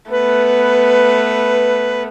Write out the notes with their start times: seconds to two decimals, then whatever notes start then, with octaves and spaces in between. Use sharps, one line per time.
0.11 A3 B3 B4